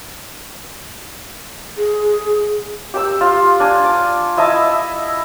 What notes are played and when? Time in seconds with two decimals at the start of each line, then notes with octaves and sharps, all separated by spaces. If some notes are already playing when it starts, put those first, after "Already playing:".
1.78 G#4
2.94 G4 G5 E6
3.21 F4
3.60 D4 G#5
3.85 D6
4.37 E4 D#5 E5 A5